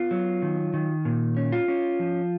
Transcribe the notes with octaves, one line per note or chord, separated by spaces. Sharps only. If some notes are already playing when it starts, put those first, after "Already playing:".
Already playing: B3 F4
F#3
D#3
D#3
A#2
C#4
F4
C#4
F3